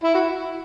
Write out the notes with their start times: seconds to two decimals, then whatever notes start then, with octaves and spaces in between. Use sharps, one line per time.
0.03 E4
0.15 F#4